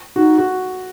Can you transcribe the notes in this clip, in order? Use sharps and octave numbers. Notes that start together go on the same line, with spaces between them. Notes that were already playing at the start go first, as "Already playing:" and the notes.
D#4 F#4
F#4